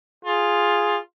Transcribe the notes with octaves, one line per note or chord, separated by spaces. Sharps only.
F4 G#4